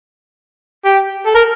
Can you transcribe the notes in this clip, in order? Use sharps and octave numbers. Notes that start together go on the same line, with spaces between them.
G4
A4
A#4